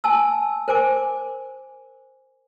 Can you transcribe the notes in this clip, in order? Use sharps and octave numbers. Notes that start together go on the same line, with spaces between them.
G#5 A5 E6
A#4 C5 G#5 D6